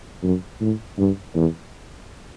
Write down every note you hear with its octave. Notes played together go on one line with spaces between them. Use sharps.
F#2
A2
G2
E2